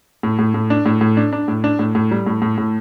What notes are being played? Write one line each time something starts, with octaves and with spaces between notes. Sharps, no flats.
A2
A2
A2
D4
A2
A2
D4
D4
A2
D4
A2
A2
G3
A2
A2
A2